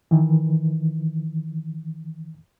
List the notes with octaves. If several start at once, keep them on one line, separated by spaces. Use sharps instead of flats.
D#3 E3